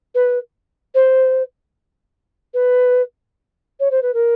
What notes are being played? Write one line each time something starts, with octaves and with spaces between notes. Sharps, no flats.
B4
C5
B4
C#5
C5
B4
A#4